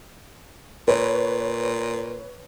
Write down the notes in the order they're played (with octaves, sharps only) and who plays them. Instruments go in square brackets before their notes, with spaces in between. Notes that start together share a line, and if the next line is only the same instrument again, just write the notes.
[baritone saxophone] A#2 [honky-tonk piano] B4 C#5